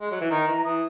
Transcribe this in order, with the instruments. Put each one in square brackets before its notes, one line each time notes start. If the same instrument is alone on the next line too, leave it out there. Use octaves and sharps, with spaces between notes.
[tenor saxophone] G#3
F#3
E3
[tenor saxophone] D#3 [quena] A#5
[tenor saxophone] E3
[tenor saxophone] E3 [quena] D#6